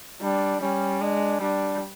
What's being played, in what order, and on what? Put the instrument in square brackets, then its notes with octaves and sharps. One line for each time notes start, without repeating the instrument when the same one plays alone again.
[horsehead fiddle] G3 [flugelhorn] D4
[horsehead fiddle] G3 [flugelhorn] C#4
[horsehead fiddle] G#3 [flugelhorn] D4
[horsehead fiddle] G3 [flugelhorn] D4